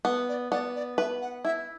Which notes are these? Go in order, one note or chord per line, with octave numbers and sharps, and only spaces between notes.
B3 B4
D5
B3 D5
D5
B4 E5
F#5
E4 E5